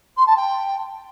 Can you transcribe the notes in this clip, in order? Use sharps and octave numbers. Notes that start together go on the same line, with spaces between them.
C6
A5
G5